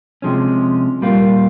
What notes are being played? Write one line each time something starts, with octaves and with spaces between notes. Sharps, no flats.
C3 F3 G#3 C#4
A#2 G3 A#3 F4